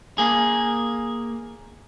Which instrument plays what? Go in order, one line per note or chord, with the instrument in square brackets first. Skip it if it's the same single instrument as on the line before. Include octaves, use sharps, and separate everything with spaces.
[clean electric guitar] A#3 G#4